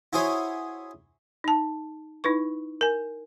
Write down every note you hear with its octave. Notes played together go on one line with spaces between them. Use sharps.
E4 F#4 G#4 C5 C#5
D#4 A5
D#4 E4 B4 C#6
A#4 G#5